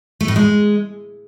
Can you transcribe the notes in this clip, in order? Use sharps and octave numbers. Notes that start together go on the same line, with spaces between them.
A3
A2
G#3